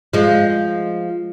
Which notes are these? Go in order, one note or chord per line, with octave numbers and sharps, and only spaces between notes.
F3 G#3